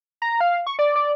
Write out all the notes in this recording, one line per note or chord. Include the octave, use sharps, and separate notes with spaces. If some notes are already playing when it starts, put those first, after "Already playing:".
A#5
F5
C#6
D5
D5